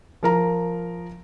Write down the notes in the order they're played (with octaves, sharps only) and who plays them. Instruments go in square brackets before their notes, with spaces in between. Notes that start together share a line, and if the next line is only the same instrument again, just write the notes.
[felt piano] F3 A#4 A#5